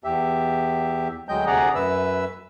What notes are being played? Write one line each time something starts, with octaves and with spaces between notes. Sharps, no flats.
E2 G4 E5
D2 F#3 G#3 D#5 G5 G6
D2 C3 G#4 D5 F#5 A#5
F#2 B4 E5 E6